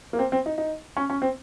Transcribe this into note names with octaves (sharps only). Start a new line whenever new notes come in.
A#3
C4
C4
D#4
D#4
C#4
C#4
C4